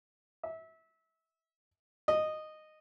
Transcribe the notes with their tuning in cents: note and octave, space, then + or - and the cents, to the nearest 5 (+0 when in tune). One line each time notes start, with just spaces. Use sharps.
E5 -25
D#5 -10